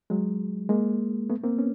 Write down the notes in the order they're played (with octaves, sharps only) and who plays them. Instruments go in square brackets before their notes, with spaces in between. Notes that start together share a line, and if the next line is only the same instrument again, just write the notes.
[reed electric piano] F#3 G#3
G#3 A#3
A3 B3
A#3 C4
B3 C#4